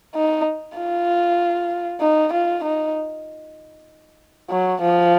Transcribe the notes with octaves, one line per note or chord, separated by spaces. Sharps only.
D#4
F4
D#4
F4
D#4
F#3
F3